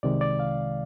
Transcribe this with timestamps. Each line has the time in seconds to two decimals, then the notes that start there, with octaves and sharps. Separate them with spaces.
0.03 C2 C3 D#3 G#3 D5
0.21 D5
0.40 F5